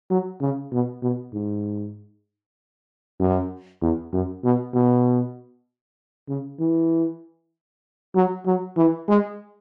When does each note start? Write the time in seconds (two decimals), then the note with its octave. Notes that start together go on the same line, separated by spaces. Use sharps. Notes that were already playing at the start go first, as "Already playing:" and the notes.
0.10 F#3
0.41 C#3
0.73 B2
1.03 B2
1.34 G#2
3.20 F#2
3.81 E2
4.13 F#2
4.44 B2
4.74 B2
6.29 C#3
6.60 E3
8.15 F#3
8.46 F#3
8.77 E3
9.08 G#3